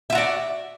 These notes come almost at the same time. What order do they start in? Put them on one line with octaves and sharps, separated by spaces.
E5 F4 F#4 D5